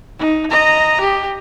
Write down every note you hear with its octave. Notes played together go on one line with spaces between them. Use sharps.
D#4
D#5 A#5
G4